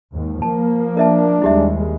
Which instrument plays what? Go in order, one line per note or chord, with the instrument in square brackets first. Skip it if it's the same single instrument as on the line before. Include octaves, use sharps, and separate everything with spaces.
[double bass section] D#2 G#2
[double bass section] F3 A#3 [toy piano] A5
[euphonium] D4 [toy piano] A#4 E5 A5
[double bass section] D#2 G3 G#3 [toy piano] E4 G4 E5